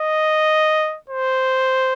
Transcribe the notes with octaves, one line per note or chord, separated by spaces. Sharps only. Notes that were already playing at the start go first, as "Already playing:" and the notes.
Already playing: D#5
C5